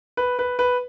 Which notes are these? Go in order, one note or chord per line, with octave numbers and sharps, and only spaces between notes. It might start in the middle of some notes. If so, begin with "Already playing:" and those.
B4
B4
B4